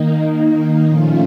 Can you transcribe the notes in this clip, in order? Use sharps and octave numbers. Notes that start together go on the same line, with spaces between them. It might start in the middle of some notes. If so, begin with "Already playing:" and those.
Already playing: D#3 A#3 D#4
A#2 F3 A3 C#4 F4